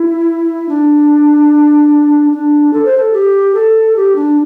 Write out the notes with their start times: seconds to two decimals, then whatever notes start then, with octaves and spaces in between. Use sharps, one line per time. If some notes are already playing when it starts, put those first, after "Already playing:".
Already playing: E4
0.69 D4
2.32 D4
2.73 A4
2.85 C5
2.97 A4
3.13 G4
3.54 A4
3.96 G4
4.16 D4